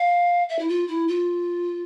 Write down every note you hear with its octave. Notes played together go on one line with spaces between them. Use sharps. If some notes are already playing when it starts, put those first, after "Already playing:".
Already playing: F5
E5
E4
F4
E4
F4